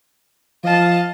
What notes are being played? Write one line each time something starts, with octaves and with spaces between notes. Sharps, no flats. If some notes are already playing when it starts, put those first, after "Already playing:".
F3 D#5 F5 A5